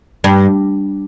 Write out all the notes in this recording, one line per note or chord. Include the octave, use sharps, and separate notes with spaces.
G2